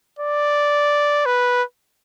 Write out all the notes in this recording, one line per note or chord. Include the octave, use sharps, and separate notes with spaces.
D5
B4